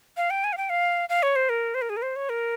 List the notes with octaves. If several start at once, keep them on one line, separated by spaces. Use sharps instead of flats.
F5
G5
G#5
F5
G5
F5
F5
C#5
C5
A#4
C5
A#4
G#4
A#4
C5
C#5
A#4